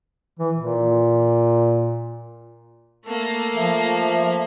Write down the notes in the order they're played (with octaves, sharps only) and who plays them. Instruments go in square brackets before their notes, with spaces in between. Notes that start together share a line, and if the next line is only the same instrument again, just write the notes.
[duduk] E3
A#2
[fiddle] A3 A#3
[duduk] F3 [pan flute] E5